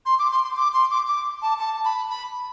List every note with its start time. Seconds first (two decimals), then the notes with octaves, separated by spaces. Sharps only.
0.06 C6
0.19 D6
0.31 C6
0.44 C6
0.56 D6
0.74 C6
0.91 D6
1.08 D6
1.42 A5
1.59 A5
1.85 B5
2.10 B5